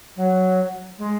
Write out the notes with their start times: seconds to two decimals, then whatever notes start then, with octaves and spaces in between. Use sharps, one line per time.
0.16 F#3
0.98 G#3